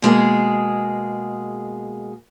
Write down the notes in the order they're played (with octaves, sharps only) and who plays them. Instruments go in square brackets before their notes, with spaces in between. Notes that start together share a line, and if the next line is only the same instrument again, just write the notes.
[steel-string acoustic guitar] B2 G#3 A#3 G#4